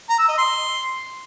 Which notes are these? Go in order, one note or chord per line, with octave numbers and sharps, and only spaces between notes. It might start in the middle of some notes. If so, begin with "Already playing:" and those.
A#5
E6
D#5
C6